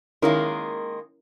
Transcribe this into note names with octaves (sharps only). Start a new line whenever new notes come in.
D#3 G#3 A#3 C#4 E4 A#4